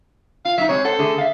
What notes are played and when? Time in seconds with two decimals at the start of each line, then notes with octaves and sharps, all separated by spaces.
0.45 F4 F5
0.58 F#3 C#4 D#4 E5
0.69 G#3 C4 G4 C#5
0.85 A4 C5 F#5
0.99 D3 A3 G#4
1.18 E5 F5